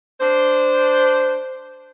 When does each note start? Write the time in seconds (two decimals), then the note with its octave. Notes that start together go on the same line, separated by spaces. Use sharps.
0.20 D4 C5